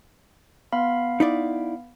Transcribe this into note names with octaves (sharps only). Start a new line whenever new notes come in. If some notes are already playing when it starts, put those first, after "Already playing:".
B3 F5 B5
D#4 E4 D5